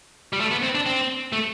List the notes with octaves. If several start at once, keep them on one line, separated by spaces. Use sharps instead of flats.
G3
A3
B3
C4
D4
C4
A3